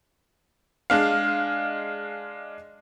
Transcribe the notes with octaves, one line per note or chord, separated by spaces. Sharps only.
G#3 D4 F5